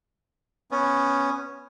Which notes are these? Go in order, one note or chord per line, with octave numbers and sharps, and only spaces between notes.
B3 C#4